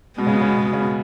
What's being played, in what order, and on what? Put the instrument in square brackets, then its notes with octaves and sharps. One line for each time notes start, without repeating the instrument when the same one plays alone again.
[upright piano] B2 [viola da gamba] G#3 B3
[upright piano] C#3
B2
C#3
B2
C#3
B2
C#3
B2